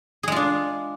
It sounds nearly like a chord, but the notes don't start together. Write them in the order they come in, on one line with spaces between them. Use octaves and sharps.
G#4 G#3 F4 D4